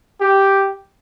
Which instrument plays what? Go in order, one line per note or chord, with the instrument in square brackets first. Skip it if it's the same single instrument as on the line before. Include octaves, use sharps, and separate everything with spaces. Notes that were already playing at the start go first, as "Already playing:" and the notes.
[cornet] G4